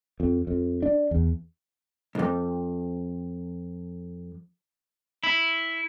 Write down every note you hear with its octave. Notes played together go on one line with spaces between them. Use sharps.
F2
F2
D4
E2
B1 F2
E4